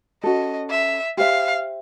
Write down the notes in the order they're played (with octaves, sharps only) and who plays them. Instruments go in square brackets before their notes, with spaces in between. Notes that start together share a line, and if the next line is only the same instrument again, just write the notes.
[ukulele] C#4 F#4 A4 [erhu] D#5
[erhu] E5
[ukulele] G4 C5 E5 [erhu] F5